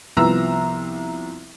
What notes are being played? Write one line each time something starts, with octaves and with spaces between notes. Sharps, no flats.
C2 F3 B3 A#5 E6